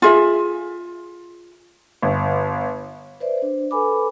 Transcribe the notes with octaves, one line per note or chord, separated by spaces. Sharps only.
F4 G#4 E5
G1
B4 C5 D5 E5
D4 C5
A4 B4 G#5 B5 D6